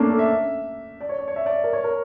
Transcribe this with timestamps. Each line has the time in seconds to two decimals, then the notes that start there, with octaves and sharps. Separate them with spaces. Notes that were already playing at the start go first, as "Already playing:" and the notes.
Already playing: A3 A#3 C#4 D4
0.10 A4
0.19 E5
1.00 D5
1.09 C#5
1.18 D5
1.28 C#5
1.36 E5
1.46 D5
1.64 A#4
1.73 C#5
1.84 A#4